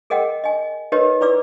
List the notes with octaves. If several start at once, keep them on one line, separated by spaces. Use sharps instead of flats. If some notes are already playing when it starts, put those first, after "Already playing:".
G#4 A#4 D#5 F#5 G5
D#5 G#5
D#4 G4 A#4 B4 C#5 D#5
E4 B4 D5 D6 E6